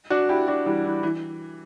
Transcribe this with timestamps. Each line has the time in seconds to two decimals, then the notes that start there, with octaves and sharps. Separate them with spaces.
0.10 D4 F#4
0.29 E4 G4
0.48 D4 F#4
0.66 E3 G3
0.85 E3
1.03 E3